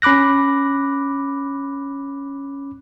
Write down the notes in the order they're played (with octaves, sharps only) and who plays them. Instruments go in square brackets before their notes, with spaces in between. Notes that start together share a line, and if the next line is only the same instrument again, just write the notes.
[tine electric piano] C#4 B5 D6 F#6 A#6